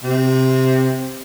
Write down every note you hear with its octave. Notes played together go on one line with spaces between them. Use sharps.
C3